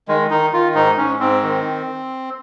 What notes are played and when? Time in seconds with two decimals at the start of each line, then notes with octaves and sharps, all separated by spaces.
0.08 D#3 G#3
0.31 D#3 D#4
0.53 D#3 F4
0.75 G#2 D#4
0.97 G#2 C#4
1.19 G#2 C4
1.42 D#3